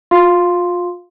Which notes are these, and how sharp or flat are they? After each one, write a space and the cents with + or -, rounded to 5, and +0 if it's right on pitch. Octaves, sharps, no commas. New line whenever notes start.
F4 +30 F5 +0 C6 +0